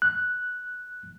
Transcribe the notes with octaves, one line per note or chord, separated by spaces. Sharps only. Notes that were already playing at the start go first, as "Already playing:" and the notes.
F#6